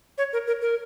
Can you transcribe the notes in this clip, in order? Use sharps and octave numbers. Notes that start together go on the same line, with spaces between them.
C#5
A#4
A#4
A#4